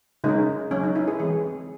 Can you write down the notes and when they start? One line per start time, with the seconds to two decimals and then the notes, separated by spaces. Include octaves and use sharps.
0.24 C#3 G#3 C#4 D#4
0.71 F#3 C#4
0.83 D#4
0.95 E4
1.08 G#4
1.19 E3 G#3 C4 G#4